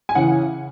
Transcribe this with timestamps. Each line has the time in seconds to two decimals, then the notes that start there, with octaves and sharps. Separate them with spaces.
0.09 G#5
0.15 C#3 E3 F#5